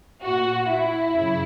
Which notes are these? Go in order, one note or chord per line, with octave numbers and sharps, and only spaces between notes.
A#2 F#4
E4
F#2 C#3